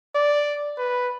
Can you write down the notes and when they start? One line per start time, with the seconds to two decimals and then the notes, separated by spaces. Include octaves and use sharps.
0.15 D5
0.78 B4